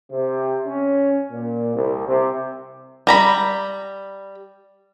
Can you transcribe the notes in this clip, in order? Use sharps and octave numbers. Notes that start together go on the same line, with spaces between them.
C3
C#4
A#2
C2
C3
G3 A#5 B5